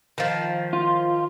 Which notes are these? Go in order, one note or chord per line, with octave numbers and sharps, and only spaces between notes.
D#3 F3
F4